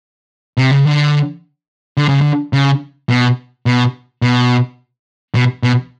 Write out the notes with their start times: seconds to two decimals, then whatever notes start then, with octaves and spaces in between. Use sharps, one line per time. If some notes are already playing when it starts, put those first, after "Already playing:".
0.57 C3
0.71 C#3
0.85 D3
1.97 D3
2.09 C#3
2.21 D3
2.53 C#3
3.10 B2
3.66 B2
4.22 B2
5.35 B2
5.63 B2